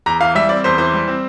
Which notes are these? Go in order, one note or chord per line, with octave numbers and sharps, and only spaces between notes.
E2 A#5
E3 F5
G3 E5
C4 D5
E2 C5
E3 C5
G3
C4